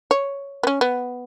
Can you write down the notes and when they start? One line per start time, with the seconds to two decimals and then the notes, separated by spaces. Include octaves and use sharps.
0.11 C#5
0.63 B3
0.67 C#4
0.81 B3